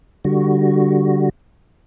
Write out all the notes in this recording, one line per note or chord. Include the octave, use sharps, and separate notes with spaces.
D3 G3 F#4